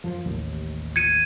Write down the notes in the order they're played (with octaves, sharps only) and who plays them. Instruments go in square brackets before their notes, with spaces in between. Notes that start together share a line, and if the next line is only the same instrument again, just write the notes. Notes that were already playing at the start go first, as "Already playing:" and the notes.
[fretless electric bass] F#2 F3
A1 D#2
[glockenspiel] G#6 C#7 D#7